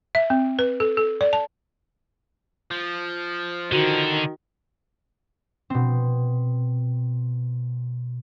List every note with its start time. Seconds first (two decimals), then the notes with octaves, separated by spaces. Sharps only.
0.15 E5
0.30 C4
0.59 B4
0.80 A4
0.97 A4
1.21 D5
1.33 A5
2.71 F3
3.72 D3 D#3 F#4
5.70 B2 C4